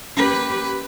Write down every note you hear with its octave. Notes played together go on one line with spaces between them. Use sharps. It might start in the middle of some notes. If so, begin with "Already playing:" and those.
A#3 C#4 G4 B4